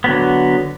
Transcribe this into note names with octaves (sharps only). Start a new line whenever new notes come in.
D3 F#3 B3